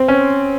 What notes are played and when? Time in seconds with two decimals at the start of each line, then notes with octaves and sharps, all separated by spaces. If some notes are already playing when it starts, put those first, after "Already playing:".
Already playing: C4
0.08 C#4